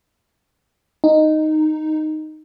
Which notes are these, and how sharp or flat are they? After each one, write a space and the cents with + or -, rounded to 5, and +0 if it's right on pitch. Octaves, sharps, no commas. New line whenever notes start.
D#4 -5